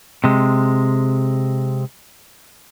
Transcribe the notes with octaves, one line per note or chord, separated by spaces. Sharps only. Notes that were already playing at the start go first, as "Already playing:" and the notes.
C3 G#3